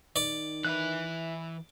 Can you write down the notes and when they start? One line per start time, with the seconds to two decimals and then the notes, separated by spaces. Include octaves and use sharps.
0.16 D#3 D5
0.65 E3 E4 B4 E5 F#6